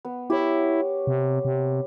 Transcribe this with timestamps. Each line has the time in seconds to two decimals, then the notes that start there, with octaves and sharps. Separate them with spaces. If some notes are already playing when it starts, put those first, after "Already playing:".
0.05 B3
0.30 E4 G4 C#5
1.07 C3
1.45 C3